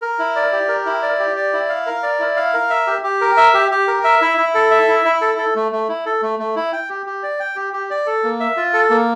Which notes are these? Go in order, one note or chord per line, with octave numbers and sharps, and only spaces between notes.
A#4
E4
D5
G4
A#4
E4
D5
G4
D5
E4
F5
A#4
D5
E4
F5
A#4
E5
G4
G4
A#4
E5
G4
G4
A#4
E5
E4
E4
A4
E5
E4
E4
A4
A4
A3
A3
E4
A4
A3
A3
E4
G5
G4
G4
D5
G5
G4
G4
D5
A4
A#3
E5
F4
A4
A#3